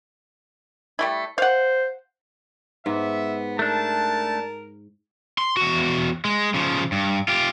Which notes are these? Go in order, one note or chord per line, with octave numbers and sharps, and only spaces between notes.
G3 A3 E4
C5 F5 F#5
G#2 B3 E5
A3 D4 A#4 A5
C6
E2 F#4
G#3
C#3 F3
G2
F4 G4